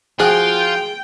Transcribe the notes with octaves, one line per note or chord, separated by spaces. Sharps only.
F3 F4 F#4 G#4 G5